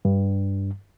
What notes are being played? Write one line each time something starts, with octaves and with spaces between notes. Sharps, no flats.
G2